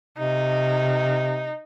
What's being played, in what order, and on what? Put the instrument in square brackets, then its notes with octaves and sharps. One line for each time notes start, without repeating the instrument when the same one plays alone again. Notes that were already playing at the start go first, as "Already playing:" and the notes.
[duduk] C3 [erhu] D#4